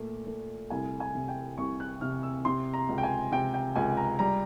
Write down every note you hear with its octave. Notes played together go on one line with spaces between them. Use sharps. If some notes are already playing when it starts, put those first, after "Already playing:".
Already playing: A#2 A3
A3
C2 G#5
G#5
C3
G5
C2 C#6
F#6
C3 F6
E6
C3 C6
A#5
C#2
G5
G#5
C3 G5
G5
C#2 G#5
A#5
G3 A#5